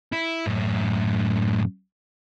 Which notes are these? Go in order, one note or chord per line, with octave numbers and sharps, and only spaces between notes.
E4
F#2 A2